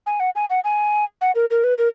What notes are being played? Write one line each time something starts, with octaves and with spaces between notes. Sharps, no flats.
G#5
F#5
G#5
F#5
G#5
F#5
A#4
A#4
B4
A#4